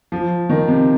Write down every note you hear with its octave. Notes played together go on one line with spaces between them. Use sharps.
F3
D#3
C3